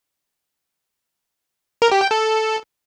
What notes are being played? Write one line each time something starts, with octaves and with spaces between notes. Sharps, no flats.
A#4
G4
G5
A4